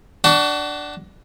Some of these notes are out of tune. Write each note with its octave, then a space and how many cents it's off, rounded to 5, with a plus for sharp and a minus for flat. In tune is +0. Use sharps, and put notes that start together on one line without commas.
D4 +0 F#4 +30